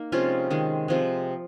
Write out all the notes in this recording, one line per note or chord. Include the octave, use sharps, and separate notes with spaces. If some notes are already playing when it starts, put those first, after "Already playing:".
Already playing: A#3 D#4
C3 F3 G#3 C#4 F4
D#3 G#3
C3 F3 G#3